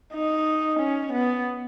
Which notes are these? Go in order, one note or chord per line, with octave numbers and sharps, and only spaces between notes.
D#4
C#4
B3